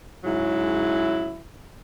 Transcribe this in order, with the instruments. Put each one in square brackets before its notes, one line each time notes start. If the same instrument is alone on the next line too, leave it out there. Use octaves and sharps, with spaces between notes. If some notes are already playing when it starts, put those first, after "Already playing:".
[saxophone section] G#2 C#3 F#3 E4